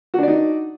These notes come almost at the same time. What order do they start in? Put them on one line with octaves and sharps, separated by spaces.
F#4 D4 D5 D#4